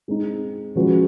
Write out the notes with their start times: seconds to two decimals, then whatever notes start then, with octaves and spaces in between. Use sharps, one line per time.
0.08 G#3 C4 D#4
0.75 F3 G#3 C#4 F#4 B4